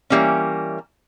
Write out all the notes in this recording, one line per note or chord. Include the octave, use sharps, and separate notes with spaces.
E3 G3 A#3 C#4